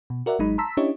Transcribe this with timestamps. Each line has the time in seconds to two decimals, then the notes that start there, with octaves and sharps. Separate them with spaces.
0.10 B2
0.26 F#4 A#4 D5 E5 F#5
0.39 G#1 F#3 G#3 D#4 B5
0.58 A5 A#5 C6 E6 B6
0.77 C#4 D4 E4 G4 C#5 D#5